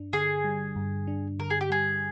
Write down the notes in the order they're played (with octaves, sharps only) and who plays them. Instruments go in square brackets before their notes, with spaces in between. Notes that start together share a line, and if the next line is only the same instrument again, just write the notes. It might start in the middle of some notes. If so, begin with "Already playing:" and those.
Already playing: [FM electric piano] G2 D4
[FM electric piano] D3 [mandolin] G#4
[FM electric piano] G3
G2
D4
[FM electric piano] D3 [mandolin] A#4
[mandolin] G#4
G4
[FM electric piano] G3 [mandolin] G#4